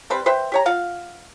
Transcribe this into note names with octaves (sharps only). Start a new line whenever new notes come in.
G3 C4 B4 C5
B4 C5 E5 G5
G4 C#5 A#5
F4 F5 F#5